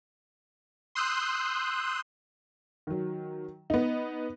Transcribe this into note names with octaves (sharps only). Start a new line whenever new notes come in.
C6 D#6 E6 F#6 G6
D#3 F#3
B3 D#4